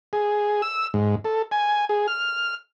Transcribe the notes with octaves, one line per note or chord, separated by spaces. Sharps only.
G#4
E6
G#2
A4
G#5
G#4
F6